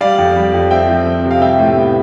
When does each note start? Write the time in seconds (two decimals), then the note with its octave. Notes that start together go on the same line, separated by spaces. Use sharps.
0.01 G3 D5 F5
0.18 F2
0.36 G3
0.54 F2
0.71 C4 E5 G5
0.89 F3
1.06 C4
1.24 C3
1.31 F5
1.41 G3 E5 G5
1.59 A2
1.77 B3